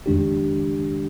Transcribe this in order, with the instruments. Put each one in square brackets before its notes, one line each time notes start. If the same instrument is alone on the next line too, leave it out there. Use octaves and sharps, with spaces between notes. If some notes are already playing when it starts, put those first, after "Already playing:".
[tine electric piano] F2 D#3 G#3 D4 G4